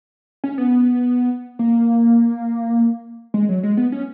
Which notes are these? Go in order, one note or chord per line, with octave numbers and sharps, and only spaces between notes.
C#4
B3
A#3
G#3
F#3
G#3
B3
C#4